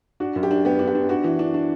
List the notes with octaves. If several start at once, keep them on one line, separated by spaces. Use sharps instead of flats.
D4 F#4
F#2
G4
D4
B3 G4
D4
G4
D4
D4 F#4
E3
D4
D4